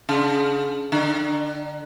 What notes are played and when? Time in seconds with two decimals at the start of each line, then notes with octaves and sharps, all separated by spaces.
0.09 C#3
0.92 D3